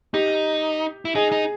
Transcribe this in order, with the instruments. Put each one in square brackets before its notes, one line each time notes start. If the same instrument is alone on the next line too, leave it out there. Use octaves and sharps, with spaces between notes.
[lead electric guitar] D#4 [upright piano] G4
[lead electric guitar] E4
[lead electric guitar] D#4 [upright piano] G#4
[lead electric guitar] D#4